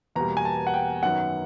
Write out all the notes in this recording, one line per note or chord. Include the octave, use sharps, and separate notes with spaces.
E2 B2 G3 A#3 A#5
G#5
A5
F#5
G5
F#2 D#3 F#3 B3 F#5